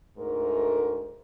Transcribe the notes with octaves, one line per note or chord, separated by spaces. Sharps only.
D2 G#2 A3 A#4